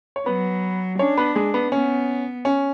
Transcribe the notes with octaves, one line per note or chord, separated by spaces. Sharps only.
C#5
F#3 B3 B4
C#4 D4 C#5
B3 B4
G#3 G#4
B3
B3 C#4
C#4